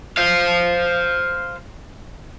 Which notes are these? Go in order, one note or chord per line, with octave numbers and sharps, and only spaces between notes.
C5 F5